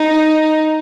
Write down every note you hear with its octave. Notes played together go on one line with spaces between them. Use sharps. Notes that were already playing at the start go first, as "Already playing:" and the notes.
Already playing: D#4